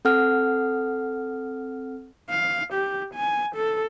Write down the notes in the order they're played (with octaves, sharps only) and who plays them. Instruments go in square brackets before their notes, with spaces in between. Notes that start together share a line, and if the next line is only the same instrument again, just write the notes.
[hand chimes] C4 A4 F#5 F6
[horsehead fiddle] F5
G4
G#5
A4